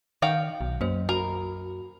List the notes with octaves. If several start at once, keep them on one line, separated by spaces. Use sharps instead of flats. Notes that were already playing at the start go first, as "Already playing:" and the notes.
D#3 F#4 F5 G5
B1
F#2 A#3 C5
F#4 A#4